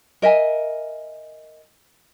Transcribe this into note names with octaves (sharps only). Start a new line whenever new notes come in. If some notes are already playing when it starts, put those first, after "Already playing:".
A#4 D#5 E5 G#5